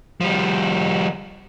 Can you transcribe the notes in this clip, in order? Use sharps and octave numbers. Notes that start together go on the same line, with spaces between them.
F3 G3